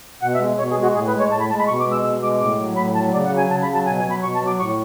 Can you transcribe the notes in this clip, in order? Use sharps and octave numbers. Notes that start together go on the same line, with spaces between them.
B2 F#5
E5
G#3
B2 C#5
G#4
G#3
F#4
A2 G#4
B4
G#3
C#5
A2 A5
B5
G#3 A5
B5
B2 C#6
D6
G#3
E6
B2 E6
G#3 D6
A2 D6
F#3
A2 B5
F#3 A5
C#3 D5
F#5
F#3
G#5
C#3 A5
B5
F#3
A5
B2 G#5
G#5
F#3
B5
B2 C#6
A5
F#3
D6
A2 C#6